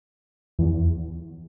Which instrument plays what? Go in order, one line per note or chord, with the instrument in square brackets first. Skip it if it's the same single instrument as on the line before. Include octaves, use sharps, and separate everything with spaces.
[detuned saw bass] E2